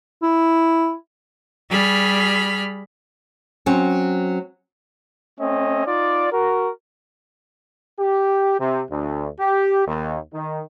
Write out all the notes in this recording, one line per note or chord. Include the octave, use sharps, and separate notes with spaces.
E4
G3 G#4 B5 F6
F#3 C4 C#4
A3 C4 C#4 D#5
D#4 F4 D5
F#4 A#4
G4
C3
D2
G4
D#2
D#3